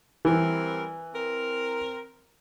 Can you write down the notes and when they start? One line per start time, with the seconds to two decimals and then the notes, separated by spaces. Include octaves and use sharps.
0.25 E3 G3 C4 A#4
1.14 C4 A#4